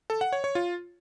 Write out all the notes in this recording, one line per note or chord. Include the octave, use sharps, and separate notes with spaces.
A4
F#5
C#5
C#5
F4